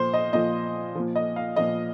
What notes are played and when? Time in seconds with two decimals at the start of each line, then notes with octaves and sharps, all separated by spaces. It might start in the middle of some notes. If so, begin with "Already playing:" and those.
Already playing: A#2 F3 C5
0.14 D#5
0.33 A#2 F3 D#5
0.95 A#2 F3
1.16 D#5
1.36 F5
1.56 A#2 F3 D#5